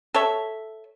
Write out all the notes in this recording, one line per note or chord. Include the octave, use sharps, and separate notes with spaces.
A4 C#5 E5